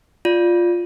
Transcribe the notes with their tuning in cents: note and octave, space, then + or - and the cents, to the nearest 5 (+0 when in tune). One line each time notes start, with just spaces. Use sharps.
F4 +0 D5 +0